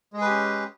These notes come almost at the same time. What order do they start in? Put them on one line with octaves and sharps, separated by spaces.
G#3 G#4 B4 G4 C#4